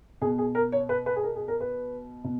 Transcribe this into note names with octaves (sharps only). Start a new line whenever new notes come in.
B2 G#4
G#4
A#4
C#5
B4
B4
G#4
A#4
G#4
A#4
B4
B2